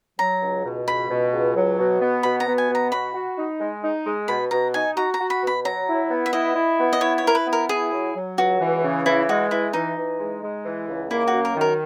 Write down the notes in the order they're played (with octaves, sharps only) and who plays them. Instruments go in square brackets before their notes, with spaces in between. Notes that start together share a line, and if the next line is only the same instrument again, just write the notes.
[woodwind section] F#3 [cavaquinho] A#5
[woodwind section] C#2
B2
[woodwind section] C#2 [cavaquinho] B5
[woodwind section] B2
C#2
F#3
B2
B3
[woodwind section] B2 [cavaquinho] B5
[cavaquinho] A#5
[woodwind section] B3
[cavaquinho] G#5
[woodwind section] B2
[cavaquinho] A#5
[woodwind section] F#4 [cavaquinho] B5
[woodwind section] F#4
D#4
G#3
D#4
G#3
[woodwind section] B2 [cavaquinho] B5
[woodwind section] B2 [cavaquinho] A#5
[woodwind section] D#4 [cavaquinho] G#5
[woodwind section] F#4 [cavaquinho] A#5
[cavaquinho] A#5
[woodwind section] F#4
[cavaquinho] B5
[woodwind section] B2
[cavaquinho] B5
[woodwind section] F#3 [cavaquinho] A#5
[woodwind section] E4
B3
[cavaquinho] E5
[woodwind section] E4 [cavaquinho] D#5
[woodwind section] E4
B3
[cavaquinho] D#5
[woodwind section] E4 [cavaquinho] C#5
[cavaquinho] C#5
[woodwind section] E4 [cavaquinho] A#4
[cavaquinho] B4
[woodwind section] B3
[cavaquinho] A#4
[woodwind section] E4 [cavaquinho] G#4
[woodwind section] F#3
F#3
[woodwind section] C#2 [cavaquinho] F#4
[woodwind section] E3
C#3
[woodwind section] E3 [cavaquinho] E4
[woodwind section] G#3 [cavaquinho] F#4
[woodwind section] E3 [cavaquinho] E4
[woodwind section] E3 [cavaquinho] D#4
[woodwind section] E3
G#3
G#3
E3
C#2
[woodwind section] A#3 [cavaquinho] E4
[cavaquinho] F#4
[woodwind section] F#2
[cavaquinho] A#4
[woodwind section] D#3 [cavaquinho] A#4